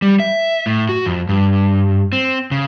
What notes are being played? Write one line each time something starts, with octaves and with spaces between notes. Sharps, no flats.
G3
E5
A2
F#4
F2
G2
C4
C#3